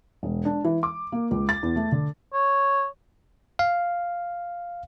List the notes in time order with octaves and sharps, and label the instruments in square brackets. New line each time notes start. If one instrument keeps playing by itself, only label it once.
[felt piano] E1
D4
E3
D6
A#3
C#2
A6
E2
A3
D3
[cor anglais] C#5
[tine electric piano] F5